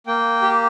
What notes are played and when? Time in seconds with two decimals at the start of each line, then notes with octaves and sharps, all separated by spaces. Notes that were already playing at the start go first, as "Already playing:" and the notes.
0.07 A#3 G5
0.42 G4